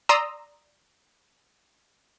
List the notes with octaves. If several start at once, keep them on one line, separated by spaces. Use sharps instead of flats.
D5 A#5 C6 D#6 E6